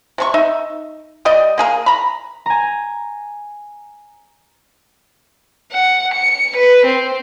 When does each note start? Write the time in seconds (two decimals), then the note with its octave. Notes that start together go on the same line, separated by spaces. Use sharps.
0.18 C3 C#4 C#6
0.34 D#4 E5
1.25 G3 D5 D#5 G5
1.58 A#3 G#4 A#4
1.86 A#5 B5
2.46 G#5 A#5
5.72 F#5
6.14 C#7
6.56 B4
6.86 C4